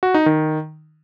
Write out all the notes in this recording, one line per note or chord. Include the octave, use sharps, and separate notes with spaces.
F#4
D#4
D#3